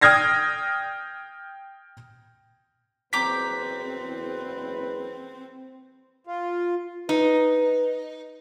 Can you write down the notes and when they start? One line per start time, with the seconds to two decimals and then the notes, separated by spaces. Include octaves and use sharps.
0.01 G5 D#6 F6 G#6 A#6 C7
3.13 F#1 E2 C4 B4 A#5 D6 G6 B6
6.27 F4
7.09 D#4 B4